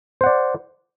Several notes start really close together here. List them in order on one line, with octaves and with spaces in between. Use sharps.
C5 F#5 D5